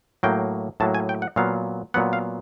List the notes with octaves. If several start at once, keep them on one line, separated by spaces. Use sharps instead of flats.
A2 F#3 A#3 G5
A2 F#3 A#3 A5
G#5
G5
F#5
A#2 F#3 B3 F5
A#2 F#3 B3 F#5
F5